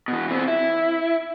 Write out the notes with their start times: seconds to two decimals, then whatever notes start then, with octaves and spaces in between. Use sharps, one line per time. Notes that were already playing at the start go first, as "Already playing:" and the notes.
0.08 B2 E3
0.28 E3 C4
0.47 E4